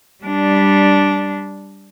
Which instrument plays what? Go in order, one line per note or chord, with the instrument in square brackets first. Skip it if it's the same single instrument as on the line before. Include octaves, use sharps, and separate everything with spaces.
[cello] G3 D4